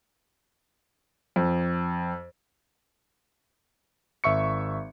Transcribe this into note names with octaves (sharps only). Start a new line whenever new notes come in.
F2
G#1 E5 C#6 C#7